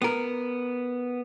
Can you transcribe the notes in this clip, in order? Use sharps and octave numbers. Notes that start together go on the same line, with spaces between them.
B3 A#4